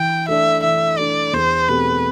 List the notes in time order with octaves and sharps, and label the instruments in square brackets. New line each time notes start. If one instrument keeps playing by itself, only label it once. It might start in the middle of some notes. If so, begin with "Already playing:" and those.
Already playing: [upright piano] E3 [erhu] G5
[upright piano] A3 D4 [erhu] E5
[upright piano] E3 [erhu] E5
[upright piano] A3 D4 [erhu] D5
[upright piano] E2 [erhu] C5
[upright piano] B2 A3 C4 G4 [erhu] B4